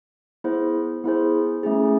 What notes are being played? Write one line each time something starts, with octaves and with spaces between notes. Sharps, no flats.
B3 E4 G#4 C5
B3 E4 G#4 C5
A3 C#4 E4 G#4